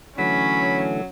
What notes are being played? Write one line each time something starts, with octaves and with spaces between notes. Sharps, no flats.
D3 E3 F#3 A3 C#4 B5